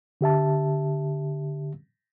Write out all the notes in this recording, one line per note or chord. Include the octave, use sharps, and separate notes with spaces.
D3 G4 E5 A5